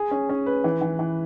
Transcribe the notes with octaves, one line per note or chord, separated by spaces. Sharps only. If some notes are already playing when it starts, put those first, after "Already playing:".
Already playing: G#4
C#4
C#4
B4
E3
E3
E3